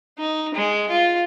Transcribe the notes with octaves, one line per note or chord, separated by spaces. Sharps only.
D#4
G#3
F4